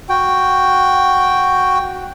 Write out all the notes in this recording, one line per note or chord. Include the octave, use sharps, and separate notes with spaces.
F#4 G5